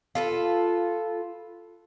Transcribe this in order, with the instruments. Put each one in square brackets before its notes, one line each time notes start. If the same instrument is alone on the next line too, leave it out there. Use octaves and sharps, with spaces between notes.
[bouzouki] F4 A4 B4